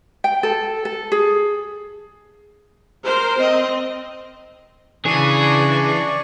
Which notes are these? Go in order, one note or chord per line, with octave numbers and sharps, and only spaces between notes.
G5
A4
A4
G#4
A#4 C5
C4 D#5
C#3 E3 D4 G#4 D5 C#6